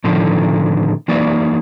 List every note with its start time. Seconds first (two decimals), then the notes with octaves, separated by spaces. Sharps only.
0.04 A2 D3 D#3 F3
1.08 E3 A#3 D#4 D5